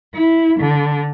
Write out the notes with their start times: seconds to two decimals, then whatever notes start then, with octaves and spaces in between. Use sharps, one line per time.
0.14 E4
0.59 D3